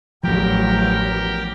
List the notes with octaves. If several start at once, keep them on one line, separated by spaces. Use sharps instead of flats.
A1 E2 F3 F#3 G4 A#4 G5